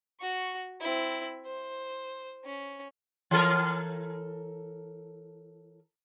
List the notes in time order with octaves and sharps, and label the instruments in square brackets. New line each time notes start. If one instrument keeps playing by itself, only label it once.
[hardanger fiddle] F#4 C#6
C4 E4
C5
C#4
[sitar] E3 A4 A#4